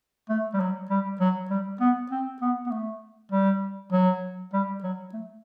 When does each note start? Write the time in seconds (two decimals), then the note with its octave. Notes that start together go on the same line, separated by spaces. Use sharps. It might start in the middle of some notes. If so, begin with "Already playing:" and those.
0.30 A3
0.54 G3
0.60 F#3
0.90 G3
1.20 F#3
1.50 G3
1.81 B3
2.11 C4
2.42 B3
2.66 B3
2.71 A3
3.32 G3
3.92 F#3
4.53 G3
4.83 F#3
5.13 A3